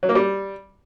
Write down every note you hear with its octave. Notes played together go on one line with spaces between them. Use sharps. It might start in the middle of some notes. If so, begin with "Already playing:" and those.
F#3
A#3
G3